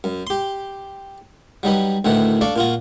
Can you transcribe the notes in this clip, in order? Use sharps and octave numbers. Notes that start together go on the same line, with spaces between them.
F#2
G4 C6
F#3 G3 D#4 B4
D2 A2 D#3 E3 F#5
D4 A4 D5 F5 C#6
A#2 F4 F#4